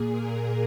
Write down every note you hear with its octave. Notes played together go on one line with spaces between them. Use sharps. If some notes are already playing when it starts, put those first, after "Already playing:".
Already playing: A#2 G#4
A#4